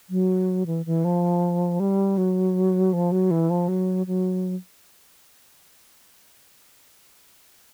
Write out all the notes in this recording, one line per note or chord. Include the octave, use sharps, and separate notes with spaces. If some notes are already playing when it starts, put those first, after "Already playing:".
F#3
E3
E3
F3
G3
F#3
F3
F#3
E3
F3
F#3
F#3